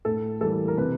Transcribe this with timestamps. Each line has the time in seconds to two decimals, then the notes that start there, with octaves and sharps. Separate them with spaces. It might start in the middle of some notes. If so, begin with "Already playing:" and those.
0.05 A2 A4
0.41 E3 G3 A#3 A4
0.68 A#4
0.77 C3 B4